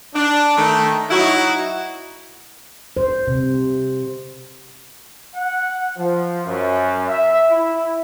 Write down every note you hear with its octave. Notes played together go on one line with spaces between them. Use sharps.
D4
D#3 A3
F#3 D#4 E4 F#4
C5
C3
F#5
F3
F#2
E5
E4